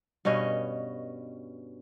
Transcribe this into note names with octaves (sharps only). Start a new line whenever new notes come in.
G2 B2 C#4 D#5